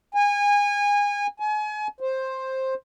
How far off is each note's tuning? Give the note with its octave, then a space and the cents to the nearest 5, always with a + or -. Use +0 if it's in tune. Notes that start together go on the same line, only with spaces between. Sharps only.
G#5 -25
G#5 +35
C5 +10